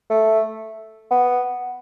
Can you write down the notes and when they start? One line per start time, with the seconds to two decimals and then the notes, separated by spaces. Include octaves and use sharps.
0.10 A3
1.11 B3